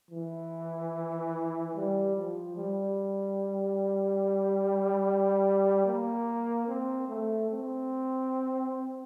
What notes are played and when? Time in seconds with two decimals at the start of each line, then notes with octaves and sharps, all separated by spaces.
0.11 E3
1.75 G3
2.16 F3
2.57 G3
5.86 A#3
6.68 C4
7.09 A3
7.50 C4